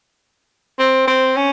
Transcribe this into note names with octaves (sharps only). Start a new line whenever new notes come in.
C4
C4
C#4